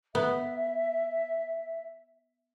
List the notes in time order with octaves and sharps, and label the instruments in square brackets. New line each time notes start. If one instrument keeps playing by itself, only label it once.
[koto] B3 [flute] E5